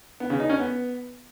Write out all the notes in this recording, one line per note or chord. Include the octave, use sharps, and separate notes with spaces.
B3
C#3
D#4
C#4
B3